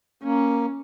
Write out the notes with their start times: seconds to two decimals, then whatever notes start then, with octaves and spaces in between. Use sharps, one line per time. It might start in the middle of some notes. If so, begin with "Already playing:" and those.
0.23 A#3 C#4